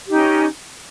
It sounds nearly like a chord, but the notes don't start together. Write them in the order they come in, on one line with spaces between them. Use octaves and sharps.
G4 D#4 C#4